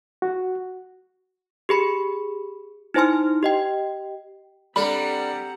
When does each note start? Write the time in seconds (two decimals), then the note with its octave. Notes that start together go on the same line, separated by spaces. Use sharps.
0.22 F#4
1.69 G4 G#4 B5 C#7
2.94 D#4 E4 C5 G#5 C6 F6
3.43 G4 D#5 G5
4.76 G3 C4 D4 A4 F#5 A#5 B5